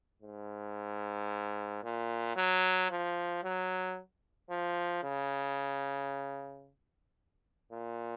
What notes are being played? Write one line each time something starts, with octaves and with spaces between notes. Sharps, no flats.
G#2
A#2
F#3
F3
F#3
F3
C#3
A#2